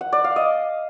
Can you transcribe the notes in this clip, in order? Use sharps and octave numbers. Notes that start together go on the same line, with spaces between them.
F#5
D5
F5
D#5